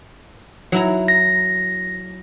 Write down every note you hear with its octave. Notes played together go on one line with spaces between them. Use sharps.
F#3 E4 A#5
A#6